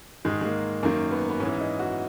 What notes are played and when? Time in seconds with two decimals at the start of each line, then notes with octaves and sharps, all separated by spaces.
0.25 G#2 D#3 G#3
0.41 G#3
0.45 A#3
0.83 F#2 D#3 A#3
1.11 B3
1.29 B3
1.40 G#2 C#4
1.45 E3
1.60 D#4
1.79 F#4